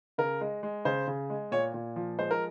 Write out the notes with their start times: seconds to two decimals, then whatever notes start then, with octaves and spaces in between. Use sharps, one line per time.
0.18 C#3 A#4
0.41 G#3
0.63 G#3
0.85 C#3 C5
1.08 C#3
1.30 G#3
1.52 A#2 C#5
1.74 A#2
1.96 F3
2.18 G#3 C5
2.31 A#4